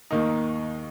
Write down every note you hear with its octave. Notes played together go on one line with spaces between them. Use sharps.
D#2 D#3 A#3 D#4